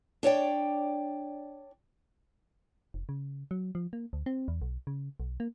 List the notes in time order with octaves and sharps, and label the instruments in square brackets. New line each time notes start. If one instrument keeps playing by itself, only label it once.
[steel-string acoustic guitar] D4 C#5 D5 G5
[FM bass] F1
C#3
F#3
F3
A#3
D2
C4
E2
B1
C#3
B1
A#3